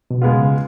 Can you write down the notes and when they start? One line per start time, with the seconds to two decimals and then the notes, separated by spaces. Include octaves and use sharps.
0.11 B2
0.22 G#3 B3 F4
0.33 C#3